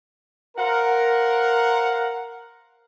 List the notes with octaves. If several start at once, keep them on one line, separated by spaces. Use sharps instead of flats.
A#4 C5 F5 F#5